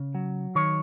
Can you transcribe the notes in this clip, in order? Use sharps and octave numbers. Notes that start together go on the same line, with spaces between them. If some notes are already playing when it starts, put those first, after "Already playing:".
Already playing: C#3
F#3
D#3 C#5